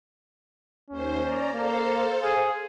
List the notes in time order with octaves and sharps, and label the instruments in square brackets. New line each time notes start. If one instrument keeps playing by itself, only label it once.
[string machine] D#2 C5 [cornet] C#4
[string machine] D5 A#5
[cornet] A#3 [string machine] A4 C5 F5
[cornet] G#4